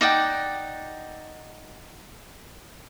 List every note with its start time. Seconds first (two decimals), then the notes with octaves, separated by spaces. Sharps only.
0.01 D#4 D5 F#5 G5